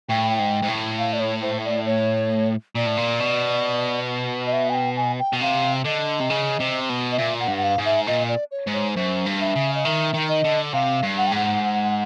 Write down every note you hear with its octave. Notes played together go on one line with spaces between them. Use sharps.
A2 G5
G#2
G#2
A2
F5
D5
C#5
C5
D5
C#5
A#2 D5
A2
A#2
B2
D#5
E5
G#5
G5
G#5
G5
B2
C3 F5
D3 D#5
C3
C#3
C3
B2
D#5
A#2 E5
F#5
G2
F#5
F5
G#2
E5
A#2 D#5
D5
C#5
G#2
C#5
F#2 C5
G2
E5
C#3
D#5
D#3 E5
D#3
D#5
D3
C3 F5
G2
F#5
G5
G#2 F#5